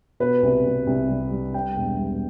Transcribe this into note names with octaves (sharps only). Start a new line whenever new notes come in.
B2 B4
C2
C2
C2
G3
G3
G3 G5
E1
G3